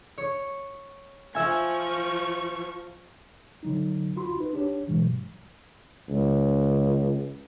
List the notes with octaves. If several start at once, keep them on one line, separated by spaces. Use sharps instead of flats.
C#5
F3 E5 G#5 C#6
D3 F#3 D#4
F4 F#4 B5 C6
D#4 B4
D4 G4 C#5
G2 B2 E3 F#3 G#3
C#2